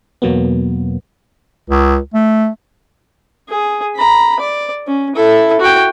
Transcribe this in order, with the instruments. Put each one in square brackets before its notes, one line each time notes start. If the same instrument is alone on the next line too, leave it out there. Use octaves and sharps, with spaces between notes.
[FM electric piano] E2 B2 F#3 A#3 B3
[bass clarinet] C#2
A3
[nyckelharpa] G#4
A#5 B5
D5
C#4
E4 A4
F#4 G5